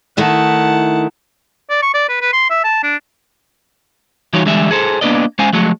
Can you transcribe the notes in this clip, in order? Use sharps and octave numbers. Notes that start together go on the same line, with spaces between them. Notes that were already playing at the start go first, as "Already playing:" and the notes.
D#3 A3 E4 F#5 A5
D5
C#6
D5
B4
B4
C6
E5
A5
D4
E3 G3 D#4 F4 F#4 C#5
D3 E3 G3 G#3 E5
G#4 A4 C5
A#3 B3 D4 B4 D5 D#5
G#3 C#4 C5 F5 G#5
F3 F#3 G#3 A3